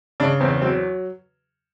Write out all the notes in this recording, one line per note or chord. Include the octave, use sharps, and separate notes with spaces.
C#3 D4
E2 C4
F#3 C4